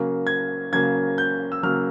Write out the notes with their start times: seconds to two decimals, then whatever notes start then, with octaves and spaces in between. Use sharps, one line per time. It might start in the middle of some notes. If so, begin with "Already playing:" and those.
Already playing: C#3 F#3 A#3
0.27 G#6
0.73 C#3 F#3 A#3 G#6
1.18 G6
1.52 E6
1.63 C#3 F#3 A#3 F6